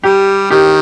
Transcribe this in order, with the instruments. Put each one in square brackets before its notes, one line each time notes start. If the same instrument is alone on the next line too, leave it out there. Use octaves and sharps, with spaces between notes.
[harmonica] G3 [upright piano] G4
[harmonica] D#3 [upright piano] G4